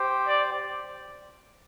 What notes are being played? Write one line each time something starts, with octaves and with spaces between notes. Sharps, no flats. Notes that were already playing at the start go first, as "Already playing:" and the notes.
Already playing: G4 C5 G5
D5